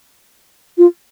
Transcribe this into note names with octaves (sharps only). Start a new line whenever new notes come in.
F4